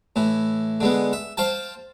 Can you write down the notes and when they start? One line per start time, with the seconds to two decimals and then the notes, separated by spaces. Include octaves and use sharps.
0.16 A2 E3
0.80 D3 G#3 B3
1.13 E5
1.37 C5 F5 G5 A5